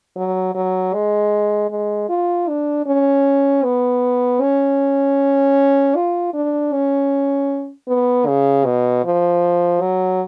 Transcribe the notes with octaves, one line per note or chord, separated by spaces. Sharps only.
F#3
F#3
G#3
G#3
F4
D4
C#4
B3
C#4
F4
D4
C#4
B3
C#3
B2
F3
F#3